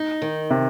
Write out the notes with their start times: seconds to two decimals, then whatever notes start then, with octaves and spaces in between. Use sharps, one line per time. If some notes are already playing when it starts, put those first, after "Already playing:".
Already playing: D#4
0.22 D#3
0.50 C3